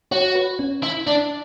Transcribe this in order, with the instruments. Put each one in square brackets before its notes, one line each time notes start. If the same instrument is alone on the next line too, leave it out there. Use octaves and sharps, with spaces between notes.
[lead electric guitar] F#4 [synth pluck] C#5
[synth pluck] B4
C#4
[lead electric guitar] E4
D4